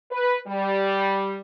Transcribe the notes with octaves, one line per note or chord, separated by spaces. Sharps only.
B4
G3